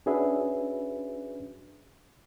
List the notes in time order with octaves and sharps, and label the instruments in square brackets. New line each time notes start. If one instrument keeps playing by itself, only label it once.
[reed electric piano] C#4 D4 F#4 G#4 B4 E5